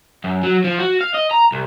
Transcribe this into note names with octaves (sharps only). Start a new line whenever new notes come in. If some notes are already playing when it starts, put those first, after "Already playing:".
F#2
F#3
F3
F#4
F5
D#5
A#5
C2